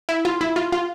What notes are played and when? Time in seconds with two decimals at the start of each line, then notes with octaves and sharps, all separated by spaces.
0.09 E4
0.25 F4
0.41 E4
0.56 F4
0.72 F4